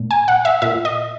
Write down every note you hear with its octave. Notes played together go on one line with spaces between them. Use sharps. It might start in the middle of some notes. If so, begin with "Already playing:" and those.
Already playing: A#2
G#5
F#5
E5
A#2 E5
D#5